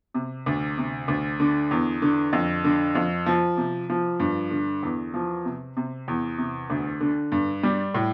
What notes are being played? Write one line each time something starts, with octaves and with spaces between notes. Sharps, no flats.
C3
D2
C3
D2
D3
E2
D3
F2
D3
F2
F3
C3
F3
G2
D3
E2
F3
C3
C3
E2
C3
D2
D3
G2
G3
A2